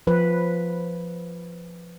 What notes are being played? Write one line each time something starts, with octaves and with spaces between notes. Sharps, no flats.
F3 B4